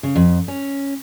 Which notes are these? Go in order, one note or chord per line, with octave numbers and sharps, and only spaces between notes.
C#3
F2
C#4